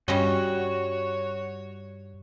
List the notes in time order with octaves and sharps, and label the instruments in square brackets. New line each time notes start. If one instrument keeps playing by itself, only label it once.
[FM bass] G2 [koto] G3 C#4 D#5 [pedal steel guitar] F#4 [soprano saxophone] C#5